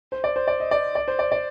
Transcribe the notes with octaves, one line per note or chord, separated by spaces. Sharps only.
C5
D5
C5
D5
D#5
D5
D5
C5
D5
D5